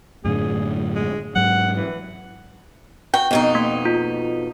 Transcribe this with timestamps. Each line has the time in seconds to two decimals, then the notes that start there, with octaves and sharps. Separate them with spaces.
0.25 F#2 A2 D3 G#4
0.96 G#3
1.36 G#2 F#3 F#5
1.76 E3
3.14 F#4 G5
3.31 F2 B2 D#4
3.55 A#3
3.85 F4